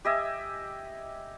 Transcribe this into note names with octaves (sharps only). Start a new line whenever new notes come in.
G4 D#5 E5 G#5